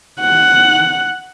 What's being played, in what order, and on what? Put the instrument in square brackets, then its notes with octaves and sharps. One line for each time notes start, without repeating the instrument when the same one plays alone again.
[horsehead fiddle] F#5